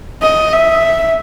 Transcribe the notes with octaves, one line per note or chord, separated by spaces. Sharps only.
D#5
E5